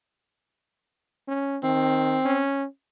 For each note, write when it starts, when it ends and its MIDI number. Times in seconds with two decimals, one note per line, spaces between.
1.28 1.58 61
1.63 2.18 51
1.63 2.41 60
2.25 2.65 61